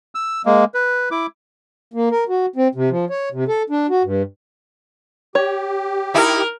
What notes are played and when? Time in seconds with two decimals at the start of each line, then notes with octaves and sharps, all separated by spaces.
0.15 E6
0.45 G#3 A#3
0.74 B4
1.11 E4 D6
1.94 A#3
2.11 A#4
2.29 F#4
2.56 C4
2.75 C3
2.90 F3
3.10 C#5
3.32 C3
3.48 A4
3.70 D4
3.90 F#4
4.04 G2
5.35 G4 C#5
6.14 D#4 E4 A#4